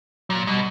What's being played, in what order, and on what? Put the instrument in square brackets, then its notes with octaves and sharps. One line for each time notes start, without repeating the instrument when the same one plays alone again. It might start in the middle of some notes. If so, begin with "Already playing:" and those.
[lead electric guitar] A#2 [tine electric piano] F#3
[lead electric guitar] B2 [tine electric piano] G3